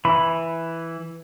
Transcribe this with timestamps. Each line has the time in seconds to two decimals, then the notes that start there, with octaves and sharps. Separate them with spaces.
0.05 E3 B5